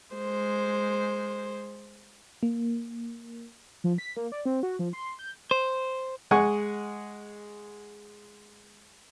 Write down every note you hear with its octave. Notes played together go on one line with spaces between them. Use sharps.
G#3 C5
A#3
F3
B6
A#3
D5
C4
F#4
F3
C6
G6
C5
G#3 F#5 G#5 C#6